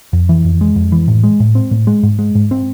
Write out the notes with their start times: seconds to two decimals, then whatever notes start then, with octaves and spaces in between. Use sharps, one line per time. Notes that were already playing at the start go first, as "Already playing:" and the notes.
0.13 F2
0.29 E3
0.45 F2
0.61 G#3
0.76 F2
0.92 E3
1.08 A2
1.23 G#3
1.40 A2
1.55 C4
1.71 A2
1.87 G#3
2.03 G#2
2.19 G#3
2.35 G#2
2.51 C4